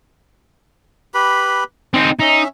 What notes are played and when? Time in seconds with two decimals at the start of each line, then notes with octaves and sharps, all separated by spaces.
1.14 G4 B4 B5
1.94 C4 D#4 C5
2.20 C#4 D#4 E5